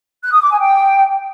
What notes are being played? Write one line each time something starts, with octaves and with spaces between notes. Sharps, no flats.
F#6
D#6
D6
G#5
G5